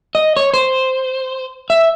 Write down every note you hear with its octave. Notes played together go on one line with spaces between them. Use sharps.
D#5
C#5
C5
E5